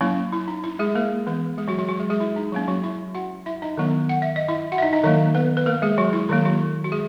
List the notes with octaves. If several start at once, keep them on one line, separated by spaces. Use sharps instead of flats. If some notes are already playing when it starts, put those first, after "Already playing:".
F#3 A#3 C#4 E4
E4
D#4
E4
G#3 G#4
A#3 A#4
E3 B3
G#3 G#4
F#3 F#4
F#3 F#4
F#3 F#4
G#3 G#4
G#3 G#4
E4
D#4
F#3 A#3 C#4
F#3 F#4
E4 E5
F#4 F#5
E4 E5
D#4 D#5
D#3 F#3 B3
F#5
E5
D#5
E4 E5
F#4 F#5
E5
D#4 D#5
D#4 D#5
D#3 F#3 A#3 D#4 D#5
B3 B4
B4
A#3 A#4
G#3 G#4
F#3 F#4
E4
D#3 F#3 A#3 E4
F#3 F#4
F#4
G#3 G#4